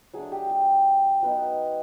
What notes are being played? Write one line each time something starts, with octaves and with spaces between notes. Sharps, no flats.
F#3 A3 D4 G#4
G4
G4
F#3 B3 D#4